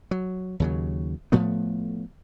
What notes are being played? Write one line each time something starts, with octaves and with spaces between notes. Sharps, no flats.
F#3
D#2 C#3 F#3
A2 F3 A3 B3